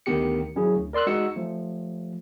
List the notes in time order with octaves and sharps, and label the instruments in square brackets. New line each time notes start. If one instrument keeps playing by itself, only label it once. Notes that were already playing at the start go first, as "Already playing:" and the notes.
[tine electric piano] D2 D#3 B3 G4 C#7
G#1 F#3 C#4 E4 G#4
D2
A#4 D5 C6 E6 F#6
G#3 D#4 F#4 E6 C#7
F3 A3